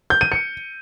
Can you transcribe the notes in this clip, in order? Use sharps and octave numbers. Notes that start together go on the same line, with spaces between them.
G6
D#7
C#7